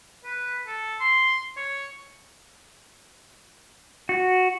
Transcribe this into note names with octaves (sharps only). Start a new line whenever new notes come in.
B4
A4
C6
C#5
F#4